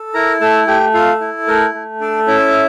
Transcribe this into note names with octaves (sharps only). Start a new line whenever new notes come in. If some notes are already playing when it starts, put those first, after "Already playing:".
Already playing: A4
E4 A#4 A#5
A3 A4 A5
A3 G4 G5
F4 A4 F5
E4
A3 A#4
A3
D4 A4 D5
C#4 E4 E5